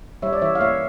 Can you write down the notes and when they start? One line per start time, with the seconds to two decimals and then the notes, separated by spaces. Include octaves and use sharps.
0.22 G3 C#5 E5
0.33 D5
0.42 E3 C#5 E5
0.55 F5
0.61 A#3 C#5 E5